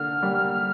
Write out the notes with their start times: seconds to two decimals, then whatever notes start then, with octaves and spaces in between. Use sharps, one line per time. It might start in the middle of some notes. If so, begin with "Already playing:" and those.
Already playing: D3 A#3 F6
0.23 G3 A#3